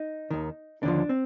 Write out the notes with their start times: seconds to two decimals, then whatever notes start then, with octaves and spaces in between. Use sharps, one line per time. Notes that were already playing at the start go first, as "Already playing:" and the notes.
Already playing: D#4
0.31 D#2 D#3
0.83 D#2 D3 F3 D4
1.09 C4